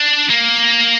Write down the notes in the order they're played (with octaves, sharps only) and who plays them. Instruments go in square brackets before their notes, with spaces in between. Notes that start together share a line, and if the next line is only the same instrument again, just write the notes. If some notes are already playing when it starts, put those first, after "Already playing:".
Already playing: [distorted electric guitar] D4
A#3